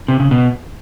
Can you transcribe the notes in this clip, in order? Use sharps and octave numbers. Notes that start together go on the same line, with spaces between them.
C3
C#3
B2